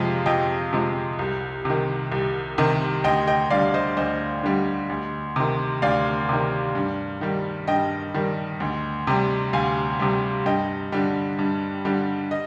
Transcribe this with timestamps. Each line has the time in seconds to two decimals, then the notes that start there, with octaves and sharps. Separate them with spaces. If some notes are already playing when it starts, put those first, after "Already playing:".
Already playing: F2 C3 F3 G#3 F5
0.26 F2 D#5 G5
0.73 C3 F3 G#3
1.19 C2
1.65 C3 D#3
2.12 C2
2.58 C3 D#3
3.04 D2 D#5 G5
3.27 D#5 G5
3.50 D3 G3 D5 F5
3.74 C5 D#5
3.97 D2 C5 D#5
4.43 D3 G3
4.90 D2
5.36 C3 D#3
5.82 D2 D5 F5
6.29 C3 D#3
6.75 G2
7.21 D#3 G3
7.68 G2 D#5 G5
8.14 D#3 G3
8.60 D2
9.07 C3 G3
9.53 D2 F5 G#5
10.00 C3 G3
10.46 G2 D#5 G5
10.92 D3 G3
11.39 G2
11.85 D3 G3
12.31 D#5